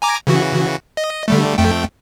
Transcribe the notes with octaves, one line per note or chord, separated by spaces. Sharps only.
G#5 A#5 D6
C#3 E3 F#4
D#5
D3 G3 A3
F2 A3 G5